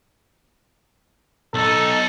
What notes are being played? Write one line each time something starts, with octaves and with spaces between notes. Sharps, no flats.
B1 D#4 A4